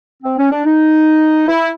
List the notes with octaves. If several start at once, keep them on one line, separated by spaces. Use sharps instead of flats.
C4
C#4
D4
D#4
E4